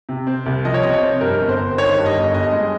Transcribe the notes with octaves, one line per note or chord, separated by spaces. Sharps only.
C3
C4
C2
F3 D#5
C#5
C3 D#5
C#5
C4
G2 A#4
G1
C5
G1
D#3 C#5
G2
D#5
G1
G2 D#5
G#3